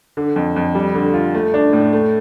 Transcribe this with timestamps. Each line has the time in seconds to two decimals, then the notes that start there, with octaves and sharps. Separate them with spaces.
0.17 D3
0.36 F2
0.56 F2
0.75 G3
0.95 D3
1.14 F4
1.34 A3
1.54 D4
1.73 A2
1.93 A3